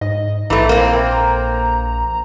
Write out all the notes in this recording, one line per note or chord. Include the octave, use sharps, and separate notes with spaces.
G#2 D#5
A#1 E3 A3 A#5
A#3 C4